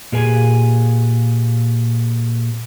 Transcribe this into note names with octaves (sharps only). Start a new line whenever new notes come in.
A#2 A#3 G4 G#4 B4 G#5